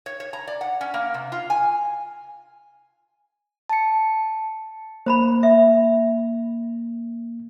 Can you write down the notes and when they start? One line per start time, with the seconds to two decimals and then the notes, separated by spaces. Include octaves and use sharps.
0.06 C#5
0.20 C#5
0.33 A#5
0.48 D5
0.61 F#5
0.81 C#4
0.94 A#3
1.14 C3
1.32 F4
1.50 G#5
3.69 A5 C#7
5.06 A#3 C5 A#5 B5
5.43 E5